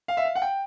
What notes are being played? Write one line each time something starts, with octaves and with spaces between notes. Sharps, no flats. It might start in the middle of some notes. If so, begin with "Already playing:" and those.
F5
E5
F5
F#5
G5